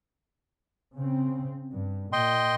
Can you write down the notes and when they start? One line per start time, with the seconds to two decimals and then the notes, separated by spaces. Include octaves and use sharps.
0.96 C#3 C4
1.73 G2
2.13 A#2 D#5 G5 C6